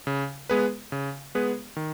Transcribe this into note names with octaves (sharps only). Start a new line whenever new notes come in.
C#3
G#3 B3 G#4 B4
C#3
G#3 B3 G#4 B4
D#3